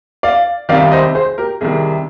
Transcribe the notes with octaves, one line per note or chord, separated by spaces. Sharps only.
D5 F5
C2 C3 D#3 D5 F5
C5 D#5
G#4 C5
G4 A#4
C2 C3 D#3 G#4